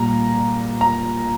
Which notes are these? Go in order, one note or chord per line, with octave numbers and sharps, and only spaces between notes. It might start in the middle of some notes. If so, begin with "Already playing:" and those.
Already playing: A#2 G3 A#5
A#5